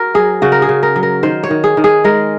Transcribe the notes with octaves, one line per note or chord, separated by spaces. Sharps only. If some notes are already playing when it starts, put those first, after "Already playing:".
Already playing: F#4 A#4
F#3 G#4
C#3 F#4
A#4
G#4
C#3
A#4
F#3
A#4
D#3 C5
C#5
D#3
G#4
D#3
G#4
G#3 A#4